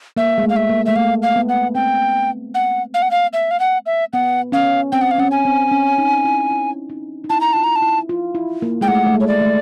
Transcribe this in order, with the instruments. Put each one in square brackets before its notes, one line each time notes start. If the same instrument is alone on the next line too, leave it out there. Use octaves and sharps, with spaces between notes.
[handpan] A#3 [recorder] E5
[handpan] G#3
A3
[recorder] F5
E5
[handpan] A#3
[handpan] A3 [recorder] E5
[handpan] A#3 [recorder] F5
[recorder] F5
[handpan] B3
[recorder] F#5
[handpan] C4 [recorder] G5
[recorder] F#5
F5
F#5
F5
E5
F5
F#5
E5
[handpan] B3 [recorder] F#5
[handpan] C#4 [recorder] F5
[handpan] C4 [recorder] G5
[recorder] F#5
F5
[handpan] C#4 [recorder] F#5
[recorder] G#5
[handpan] C4
C#4
D#4
E4
E4
D#4
D#4
[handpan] E4 [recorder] A5
[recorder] A#5
[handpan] F4 [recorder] A5
[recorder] A#5
A5
[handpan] E4
F4
E4
A#3
[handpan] G#3 [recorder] G5
[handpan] A3 [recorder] F#5
[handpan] A3
G#3
[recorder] C#5
D5
[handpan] A3